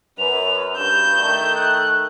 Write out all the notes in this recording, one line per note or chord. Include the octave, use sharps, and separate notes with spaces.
F#2 B4 F7
G2 G6 E7
D#3 A3
F#6